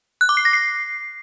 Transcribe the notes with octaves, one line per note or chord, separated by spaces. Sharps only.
F#6
D6
C7
A#6
C7